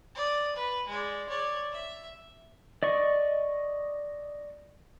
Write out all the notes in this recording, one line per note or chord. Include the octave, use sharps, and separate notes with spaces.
D5 D#6
B4
G#3 D5
C#5 D5
E5
D5 D#5 C#6